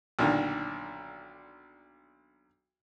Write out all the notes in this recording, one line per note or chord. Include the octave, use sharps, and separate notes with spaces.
B1 A#2 D3 D#3